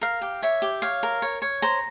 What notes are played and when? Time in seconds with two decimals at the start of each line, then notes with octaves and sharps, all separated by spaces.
0.01 A#4 F5
0.21 G4
0.42 C#5 E5
0.62 G4
0.82 C#5 F5
1.03 A#4
1.22 C#5
1.42 C#5
1.62 C5 A#5